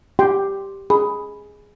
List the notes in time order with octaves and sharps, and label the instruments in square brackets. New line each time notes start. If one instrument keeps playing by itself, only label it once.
[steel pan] G4 G5 C6
[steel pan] G#4 [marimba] B5